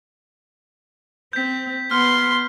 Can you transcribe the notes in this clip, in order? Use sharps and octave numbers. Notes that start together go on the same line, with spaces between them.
C4 G6 B6
B3 C6 F6